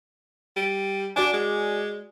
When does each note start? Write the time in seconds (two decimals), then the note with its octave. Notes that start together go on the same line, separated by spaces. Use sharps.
0.56 G3
1.16 D4 F#4 D5 G#5
1.33 G#3